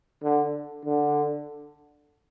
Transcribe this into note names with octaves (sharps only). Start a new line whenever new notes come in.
D3
D3